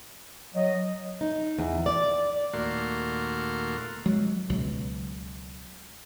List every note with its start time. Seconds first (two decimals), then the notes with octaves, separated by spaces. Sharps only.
0.55 F#3 D#5
1.21 D#4
1.59 E2
1.86 D5
2.53 D#2 A#2 A3 A#3 F#4 C6
4.06 F#3 G#3
4.50 C#2 B2 F#3